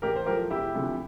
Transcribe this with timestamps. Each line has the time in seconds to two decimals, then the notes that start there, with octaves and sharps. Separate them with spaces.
0.02 A1 G4 A#4
0.16 C5
0.26 A2 F3 A3 G4 A#4
0.50 E1 E4 G4
0.74 D2 C3 F3